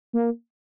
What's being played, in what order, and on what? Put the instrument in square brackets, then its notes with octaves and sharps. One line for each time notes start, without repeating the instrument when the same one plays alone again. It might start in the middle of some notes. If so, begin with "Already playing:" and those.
[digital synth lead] A#3